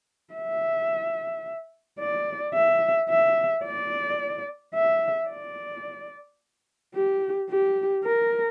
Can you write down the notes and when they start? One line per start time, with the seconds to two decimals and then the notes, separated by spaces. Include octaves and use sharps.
0.34 E5
1.99 D5
2.55 E5
3.10 E5
3.65 D5
4.75 E5
5.30 D5
6.95 G4
7.50 G4
8.05 A#4